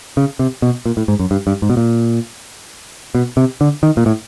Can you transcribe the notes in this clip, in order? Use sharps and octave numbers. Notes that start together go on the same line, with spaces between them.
C#3
C3
B2
A#2
A2
G#2
F#2
G2
G2
G#2
B2
A#2
B2
C3
D3
D#3
A#2
A2